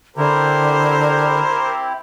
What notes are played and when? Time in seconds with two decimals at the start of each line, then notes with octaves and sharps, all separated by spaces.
0.16 D3 C4 E4 G4 A#4 C5